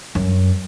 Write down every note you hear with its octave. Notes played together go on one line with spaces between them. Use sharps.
F#2